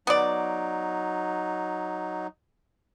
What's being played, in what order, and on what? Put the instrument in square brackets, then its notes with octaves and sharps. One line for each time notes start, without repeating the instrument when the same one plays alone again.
[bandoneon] F#3 D#4 [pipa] B3 D5